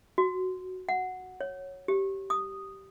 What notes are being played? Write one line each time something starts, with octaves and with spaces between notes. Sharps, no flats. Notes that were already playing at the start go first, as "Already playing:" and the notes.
F#4
F#5
C#5
G4
D#6